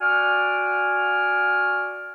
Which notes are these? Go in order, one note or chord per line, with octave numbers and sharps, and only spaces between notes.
F#4 D5 F#5 G#5 F6